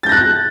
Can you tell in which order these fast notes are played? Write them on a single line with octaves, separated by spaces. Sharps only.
A6 G6 A#6 F#6